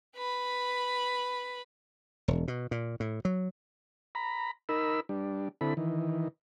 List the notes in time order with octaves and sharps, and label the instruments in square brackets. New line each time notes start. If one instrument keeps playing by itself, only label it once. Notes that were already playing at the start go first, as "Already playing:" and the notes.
[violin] B4 B5
[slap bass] E1
B2
A#2
A2
F#3
[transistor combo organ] A#5 B5
D#4 A#4 B5 E6
G3 D4
D3 C4 E4 A4 B5
D#3 E3